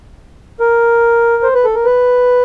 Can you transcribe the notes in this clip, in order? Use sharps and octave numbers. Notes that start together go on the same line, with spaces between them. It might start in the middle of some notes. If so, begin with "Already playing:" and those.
A#4
C5
B4
A4
A#4
B4